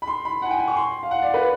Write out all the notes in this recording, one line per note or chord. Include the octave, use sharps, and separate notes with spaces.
B5
C6
B5
F#5
G#5
G5
G#5
C#6
C6
F5
F#5
D5
B4